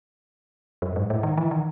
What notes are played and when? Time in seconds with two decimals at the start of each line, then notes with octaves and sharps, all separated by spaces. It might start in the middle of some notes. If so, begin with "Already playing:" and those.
0.82 F#2
0.96 G#2
1.10 A2
1.23 D#3
1.37 E3
1.51 D#3